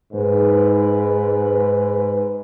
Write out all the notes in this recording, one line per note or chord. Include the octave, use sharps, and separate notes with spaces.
G#2 B4